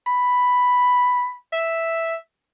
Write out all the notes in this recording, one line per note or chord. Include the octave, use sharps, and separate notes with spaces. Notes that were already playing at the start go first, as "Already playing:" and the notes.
B5
E5